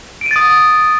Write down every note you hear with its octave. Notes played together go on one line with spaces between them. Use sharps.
D#6 A6 D7 D#7